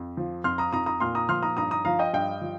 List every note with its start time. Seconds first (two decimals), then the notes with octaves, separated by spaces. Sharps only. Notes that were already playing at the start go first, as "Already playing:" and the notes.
Already playing: F2
0.17 F3
0.44 F2 C6 F6
0.58 A#5 D#6
0.73 F2 A#5 D#6
0.86 A#5 D#6
1.00 A#2 C6 F6
1.15 A#5 D#6
1.29 F3 C6 F6
1.43 A#5 D#6
1.57 G2 A#5 D#6
1.71 A#5 D#6
1.85 F3 F5 A#5
1.99 D#5 G5
2.13 G2 D#5 G5
2.41 F3